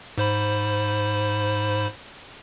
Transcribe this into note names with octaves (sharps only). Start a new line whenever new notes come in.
G#2 C5 B5